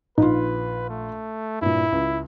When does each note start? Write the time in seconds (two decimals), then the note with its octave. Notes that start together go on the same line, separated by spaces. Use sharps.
0.18 A#1 D#4 F4 B4
0.89 A3
1.61 G2 A#2 E4
1.92 C#2